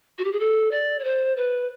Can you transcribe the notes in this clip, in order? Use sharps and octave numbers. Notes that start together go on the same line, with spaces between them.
F#4
G4
G#4
A4
D5
C#5
C5
B4